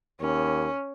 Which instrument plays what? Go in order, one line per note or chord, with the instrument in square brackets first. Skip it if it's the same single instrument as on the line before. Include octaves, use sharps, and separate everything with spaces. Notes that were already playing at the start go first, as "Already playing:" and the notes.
[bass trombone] D#2 [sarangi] C#4